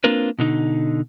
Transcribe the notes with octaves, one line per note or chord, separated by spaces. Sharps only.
A#3 C4 D4 F4 A#4 B4
B2 D3 D#4